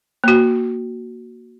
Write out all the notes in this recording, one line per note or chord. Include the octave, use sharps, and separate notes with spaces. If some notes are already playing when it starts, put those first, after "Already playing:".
A#3 F#4